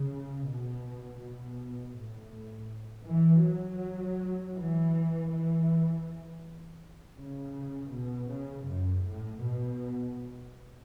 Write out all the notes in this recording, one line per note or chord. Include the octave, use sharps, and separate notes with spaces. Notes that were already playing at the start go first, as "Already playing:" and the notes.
Already playing: C#3
B2
B2
A2
E3
F#3
E3
E3
C#3
B2
C#3
F#2
A2
B2